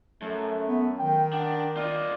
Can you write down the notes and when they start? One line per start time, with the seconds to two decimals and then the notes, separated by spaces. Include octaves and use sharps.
0.22 F#2 A3
0.68 B3
0.99 D#3 G5
1.33 D4 F#5
1.77 F4 D5 D#5